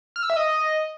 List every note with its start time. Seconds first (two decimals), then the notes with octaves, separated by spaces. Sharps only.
0.16 F6
0.23 E6
0.30 E5
0.37 D#5